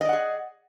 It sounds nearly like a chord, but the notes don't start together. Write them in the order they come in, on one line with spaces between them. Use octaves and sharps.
D#5 D5 F#5 G#4